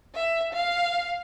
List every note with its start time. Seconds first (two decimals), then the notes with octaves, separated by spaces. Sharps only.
0.14 E5
0.53 F5